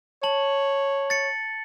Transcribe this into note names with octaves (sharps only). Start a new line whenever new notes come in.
C#5 A5 F#7
A6 C#7